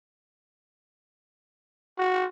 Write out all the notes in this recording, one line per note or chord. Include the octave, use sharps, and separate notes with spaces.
F#4